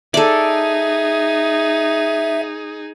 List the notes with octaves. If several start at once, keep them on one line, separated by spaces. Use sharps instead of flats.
D#4 G#4 A4 D5 E5